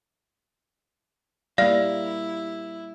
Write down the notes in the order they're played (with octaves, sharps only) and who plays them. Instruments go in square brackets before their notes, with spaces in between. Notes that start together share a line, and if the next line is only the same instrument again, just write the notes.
[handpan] G3 A#3 [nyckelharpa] E4 [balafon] D5 [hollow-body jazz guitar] F5